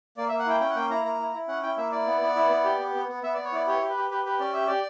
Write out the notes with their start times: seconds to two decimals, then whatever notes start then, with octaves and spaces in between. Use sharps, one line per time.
0.17 A#3 D5
0.28 E5
0.32 A#3
0.39 F#5
0.46 E4 G5
0.60 C#4 G5
0.70 F#5
0.75 A#3 G5
0.90 E4 A#5
1.04 A#3 A#5
1.19 E4
1.34 E4
1.48 C#4 F#5
1.63 E4 G5
1.77 A#3 E5
1.92 E4 D5
2.07 B3
2.21 B3
2.36 E4
2.50 B3
2.64 G4
2.80 B3
2.95 B3
3.08 B3
3.23 B3 E5
3.34 B3 D5
3.45 C#5
3.52 E4 D5
3.67 G4 C#5
3.82 G4
3.89 B4
3.97 G4
4.10 G4 B4
4.25 G4 B4
4.40 C#4 D5
4.53 G4 E5
4.67 G4 D5